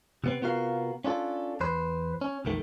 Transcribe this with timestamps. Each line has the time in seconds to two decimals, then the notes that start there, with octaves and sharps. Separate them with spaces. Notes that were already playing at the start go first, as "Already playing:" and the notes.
0.24 C3 B3 C4
0.42 C3 B3 F4 F#4 A#4 F5
1.04 C#4 D4 F4 A4
1.60 E2 B4 C5
2.21 C#4
2.45 B1 F2 D#3 A3